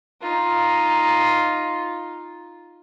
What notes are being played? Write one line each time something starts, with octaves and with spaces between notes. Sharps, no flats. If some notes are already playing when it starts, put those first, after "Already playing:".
D#4 F4